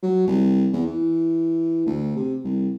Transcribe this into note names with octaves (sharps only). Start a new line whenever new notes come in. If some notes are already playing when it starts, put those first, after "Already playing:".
F#3
C2
E2
E3
D2
C3
C2